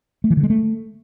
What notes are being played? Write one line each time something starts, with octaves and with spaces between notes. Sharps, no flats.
A3
E3
D3
G#3
A3